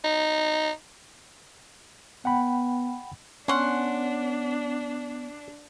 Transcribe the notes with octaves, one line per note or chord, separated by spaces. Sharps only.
D#4
B3 F#5 G5 B5
B3 C#4 D4 F#5 C6